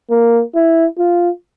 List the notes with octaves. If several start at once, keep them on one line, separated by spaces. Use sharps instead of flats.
A#3
E4
F4